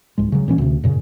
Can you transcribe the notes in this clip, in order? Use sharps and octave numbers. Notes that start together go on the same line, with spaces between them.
D1 C2 G#2 G#3
C#3 F#3
D#1 A#2 E3 C#4
D2 C3
F#2 A#2 C#3